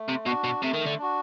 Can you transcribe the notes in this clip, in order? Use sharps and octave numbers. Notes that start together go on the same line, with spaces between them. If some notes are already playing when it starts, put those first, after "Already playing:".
Already playing: A3
C3
B2 D4 F#4
B2
C3 A3
D#3
D3
D4 F#4